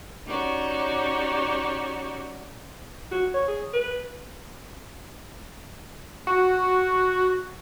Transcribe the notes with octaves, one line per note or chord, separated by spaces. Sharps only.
C#4 D#4 F#4 G4 C#5 D5
F#4
C#5
G#4
B4
F#4